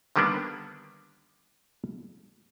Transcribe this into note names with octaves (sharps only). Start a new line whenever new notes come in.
D3 D#3 G3 A#3 B3 D4